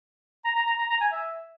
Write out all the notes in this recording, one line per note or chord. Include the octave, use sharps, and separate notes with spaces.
A#5
A#5
A#5
A#5
A#5
G#5
E5